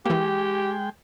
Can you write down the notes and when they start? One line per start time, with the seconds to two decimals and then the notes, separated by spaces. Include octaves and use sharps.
0.06 E3 G#3 A#3 G4 G5